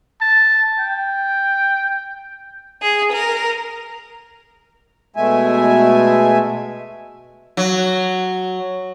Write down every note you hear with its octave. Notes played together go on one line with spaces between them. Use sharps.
A5
G5
G#4
A#4
B2 G#3 A3 E5 G#5
F#3